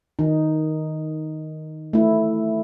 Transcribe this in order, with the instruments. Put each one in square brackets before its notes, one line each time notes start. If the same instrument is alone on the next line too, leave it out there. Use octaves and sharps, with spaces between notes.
[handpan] D#3 D#4
A3 E4